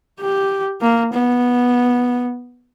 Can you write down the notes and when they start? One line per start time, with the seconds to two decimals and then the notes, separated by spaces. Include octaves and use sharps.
0.20 G4
0.82 A#3
1.13 B3